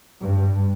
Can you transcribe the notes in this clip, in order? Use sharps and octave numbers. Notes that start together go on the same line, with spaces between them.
G2